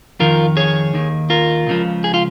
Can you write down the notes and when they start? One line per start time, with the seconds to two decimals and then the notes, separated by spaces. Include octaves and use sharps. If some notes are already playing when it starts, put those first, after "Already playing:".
0.20 F2 D#3 F4 A#4
0.57 G#4 C#5
0.93 D#2 D#3
1.30 F4 A#4
1.67 C#2 C#3 F3
2.04 G#4
2.14 F4